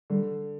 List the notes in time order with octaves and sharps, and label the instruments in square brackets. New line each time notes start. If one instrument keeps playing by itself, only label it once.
[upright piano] D3 [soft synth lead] G3